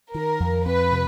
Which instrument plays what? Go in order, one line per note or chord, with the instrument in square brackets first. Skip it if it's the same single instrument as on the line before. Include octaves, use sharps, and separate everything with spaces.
[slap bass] D#3 [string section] A#4
[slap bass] F2
[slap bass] F2 [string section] B4
[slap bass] C3